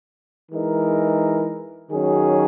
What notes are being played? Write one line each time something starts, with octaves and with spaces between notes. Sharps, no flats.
E3 G#3 D#4 A#4
D#3 F#3 C#4 G#4